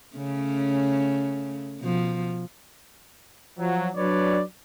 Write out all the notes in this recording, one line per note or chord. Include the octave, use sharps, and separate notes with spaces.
C#3 A3 C#4
B2 F3
F3 F#3
F#3 D4 B4 C#5 D5